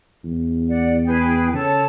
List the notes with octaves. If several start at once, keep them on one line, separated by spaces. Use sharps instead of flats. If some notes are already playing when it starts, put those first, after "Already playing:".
E2
D5 F#5
G#4 B4 G5
C#3 A4 C#5 A5